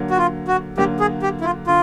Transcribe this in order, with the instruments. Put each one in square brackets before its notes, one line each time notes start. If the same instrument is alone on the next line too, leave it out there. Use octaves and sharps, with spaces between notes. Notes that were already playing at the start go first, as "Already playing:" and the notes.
Already playing: [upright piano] D3 F#3 A#3
[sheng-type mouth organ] F#4
F4
F#4
[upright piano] D3 F#3 A#3 [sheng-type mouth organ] G4
[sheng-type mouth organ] G#4
G4
E4
F4
[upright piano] D3 [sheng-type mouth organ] F4